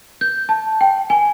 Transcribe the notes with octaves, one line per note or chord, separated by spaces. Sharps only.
G6
A5
G5
G#5